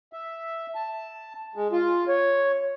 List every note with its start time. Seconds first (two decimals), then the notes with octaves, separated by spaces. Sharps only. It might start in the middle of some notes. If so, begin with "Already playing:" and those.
0.13 E5
0.75 A5
1.55 G#3
1.72 F4
2.08 C#5